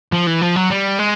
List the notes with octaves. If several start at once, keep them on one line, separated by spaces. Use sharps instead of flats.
F3
E3
F3
F#3
G3
G#3